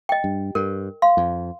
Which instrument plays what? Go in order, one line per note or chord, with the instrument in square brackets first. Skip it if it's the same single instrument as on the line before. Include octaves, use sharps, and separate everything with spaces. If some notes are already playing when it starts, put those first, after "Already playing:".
[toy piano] D#5 G5
[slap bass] G2
[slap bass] G2 [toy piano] A#4
[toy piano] F5 C6
[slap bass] F2